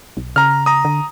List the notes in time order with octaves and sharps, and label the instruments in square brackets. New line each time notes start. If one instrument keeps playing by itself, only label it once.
[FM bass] B1
[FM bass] C#3 [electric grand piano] A#5 F6
[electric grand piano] A#5 D#6
[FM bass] D3